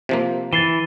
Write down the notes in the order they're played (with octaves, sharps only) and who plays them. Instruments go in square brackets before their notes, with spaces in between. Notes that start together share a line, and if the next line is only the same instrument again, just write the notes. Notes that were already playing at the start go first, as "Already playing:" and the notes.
[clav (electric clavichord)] C3 F3 A#3
[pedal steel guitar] E3 [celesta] A6 C7 G7